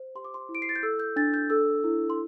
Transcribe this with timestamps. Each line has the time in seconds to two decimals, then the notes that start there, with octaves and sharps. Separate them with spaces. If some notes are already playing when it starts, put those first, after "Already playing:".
Already playing: C5
0.15 G4 C6
0.25 D6
0.34 C6
0.49 E4
0.55 D7
0.62 C7
0.69 A6
0.76 G6
0.83 A4 E6
1.00 G6
1.16 D4 A6
1.34 G6
1.50 A4 E6
1.84 E4
2.10 C6